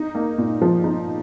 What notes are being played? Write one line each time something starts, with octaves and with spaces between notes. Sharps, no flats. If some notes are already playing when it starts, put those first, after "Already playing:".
Already playing: D#4
A#3
A#2
F3
D#4